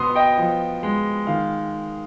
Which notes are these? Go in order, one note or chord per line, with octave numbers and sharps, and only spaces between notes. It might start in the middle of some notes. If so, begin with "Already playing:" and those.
Already playing: B2 B3 C6 D#6
D#5 G5
F3
G#3
D#3 F5